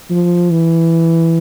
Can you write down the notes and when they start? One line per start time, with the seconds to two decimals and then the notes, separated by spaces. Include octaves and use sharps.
0.10 F3
0.51 E3